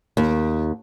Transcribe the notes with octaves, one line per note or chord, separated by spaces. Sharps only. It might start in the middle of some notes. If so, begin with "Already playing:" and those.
D#2